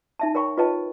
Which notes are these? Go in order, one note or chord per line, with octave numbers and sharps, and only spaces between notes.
D#4 E5 A5
A#4 C#5 G5 B5 C#6
F4 B4 C#5 D#5 G5 A5